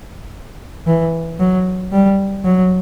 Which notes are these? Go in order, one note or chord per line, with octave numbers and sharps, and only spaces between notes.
E3
F#3
G3
F#3